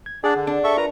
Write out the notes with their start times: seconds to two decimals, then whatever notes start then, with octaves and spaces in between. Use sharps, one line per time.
0.06 G#6
0.24 D4 G#4 D5 F#5
0.36 D3
0.47 D4
0.64 A4 E5 C#6
0.77 F4 A#4 B4 A#5